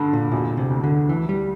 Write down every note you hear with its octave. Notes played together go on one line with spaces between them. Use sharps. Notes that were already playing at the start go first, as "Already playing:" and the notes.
Already playing: G2 D3
A#2
E1 A#2
C3
D2
D3
D2 E3
G3